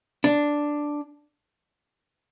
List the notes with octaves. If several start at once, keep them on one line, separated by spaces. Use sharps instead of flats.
D4